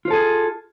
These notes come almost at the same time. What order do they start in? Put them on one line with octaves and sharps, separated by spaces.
F4 C5 A4 G#4